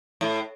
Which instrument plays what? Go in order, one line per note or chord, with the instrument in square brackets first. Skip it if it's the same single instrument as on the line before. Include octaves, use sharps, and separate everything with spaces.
[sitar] A2